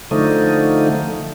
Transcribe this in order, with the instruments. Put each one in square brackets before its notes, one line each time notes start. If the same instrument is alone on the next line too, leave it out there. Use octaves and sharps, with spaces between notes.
[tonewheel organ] D3 F3 A3 D#4